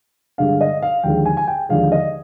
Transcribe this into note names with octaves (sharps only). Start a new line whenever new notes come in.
G2 D3 G#3 D4 F5
D#5
F5
D#2 D3 F3 G#3 G5
G#5
G#5
G5
D#2 D3 F3 G#3 F5
D#5